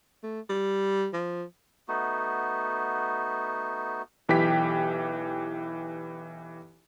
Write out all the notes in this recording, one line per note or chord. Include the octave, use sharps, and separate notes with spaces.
A3
G3
F3
A3 B3 D#4 F#4
B1 E3 G4 G5 B6